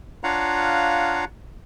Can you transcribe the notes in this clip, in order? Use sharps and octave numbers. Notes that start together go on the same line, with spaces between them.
D4 F4 C#5 F5 F#5 A#5